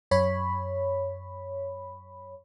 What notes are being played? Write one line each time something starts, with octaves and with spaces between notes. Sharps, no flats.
F#2 C#5 B5